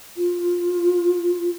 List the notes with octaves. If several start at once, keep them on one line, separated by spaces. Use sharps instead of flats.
F4